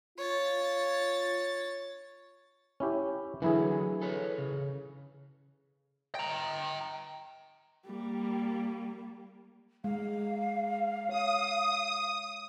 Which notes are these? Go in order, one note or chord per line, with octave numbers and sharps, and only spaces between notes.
F4 C#5 A6
C#4 E4 G4
D3 E3 F#3 E4 G#4
A4 B4 C#5
C#3
G5 A#5
G3 A#3
G#3 F5
C#5 D#6